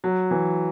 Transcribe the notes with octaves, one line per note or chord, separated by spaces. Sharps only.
F#3
E3